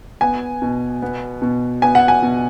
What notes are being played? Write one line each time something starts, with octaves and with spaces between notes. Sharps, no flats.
B3 G#5
B2
B3
B2
B3 G#5
F#5
G#5
B2